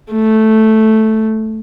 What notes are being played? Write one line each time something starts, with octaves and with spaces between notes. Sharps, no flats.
A3